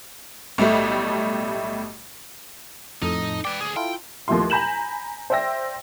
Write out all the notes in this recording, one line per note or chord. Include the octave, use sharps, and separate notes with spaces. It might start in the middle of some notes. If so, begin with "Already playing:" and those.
B1 A2 G3 A3
F2 A2 D#4 A4
B4 D5 G5
D2 G#4
E4 F4 A4 G5
D#2 F3 A3 E4 C6
G#5 A#5 B5 G6 E7 F#7
C5 D5 E5 G5 E6 A#6